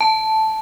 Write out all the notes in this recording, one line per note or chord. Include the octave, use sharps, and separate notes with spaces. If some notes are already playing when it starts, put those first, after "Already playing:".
A5